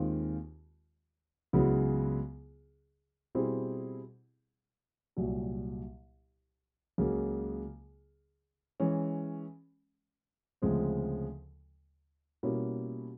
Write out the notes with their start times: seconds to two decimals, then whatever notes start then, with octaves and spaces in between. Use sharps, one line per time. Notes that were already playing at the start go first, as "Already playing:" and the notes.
Already playing: D#2 D#3 G#3 C4 F4
1.53 C#2 C#3 F#3 B3 E4
3.35 B2 G3 C4 E4 G#4
5.17 C2 A#2 F#3
6.98 C#2 C#3 F#3 A#3
8.80 E3 G#3 C#4
10.62 D2 C#3 F3 G#3 C4
12.43 B2 G3 A#3 C#4 E4